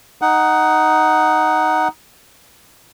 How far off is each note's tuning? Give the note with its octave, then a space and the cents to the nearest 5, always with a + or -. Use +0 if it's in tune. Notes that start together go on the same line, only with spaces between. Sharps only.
D#4 +0 F#5 +10